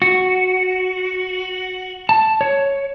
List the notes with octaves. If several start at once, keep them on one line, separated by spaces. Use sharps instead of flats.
F#4
A5
C#5